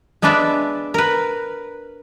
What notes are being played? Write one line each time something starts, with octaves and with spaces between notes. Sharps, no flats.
G#3 B3 D4 B4 D5 E5
A#4 B4